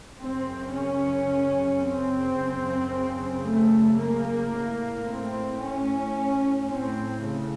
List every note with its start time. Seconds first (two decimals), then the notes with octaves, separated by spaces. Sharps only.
0.18 F#2 C#3 C4
0.73 C#4
1.81 C4
2.35 F#2 C#3
3.44 A3
3.98 A#3
4.52 A2
5.07 C4
5.61 C#4
6.69 A2 C4
7.24 C#3